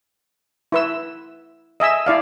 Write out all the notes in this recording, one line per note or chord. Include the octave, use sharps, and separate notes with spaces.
E4 B4 E6
D#5 E5 G#5 E6
E4 D5 F5